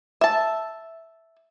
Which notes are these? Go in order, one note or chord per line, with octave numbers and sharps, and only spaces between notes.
E5 A5